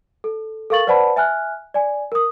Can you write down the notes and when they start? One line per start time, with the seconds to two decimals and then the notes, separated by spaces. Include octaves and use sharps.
0.24 A4
0.70 A4 A#4 F5 C#6 A6 F#7
0.87 B4 C5 D5 F#5 A5 B5
1.16 E5 G#5 F6 F#6
1.74 D5 G#5
2.12 A#4 D#6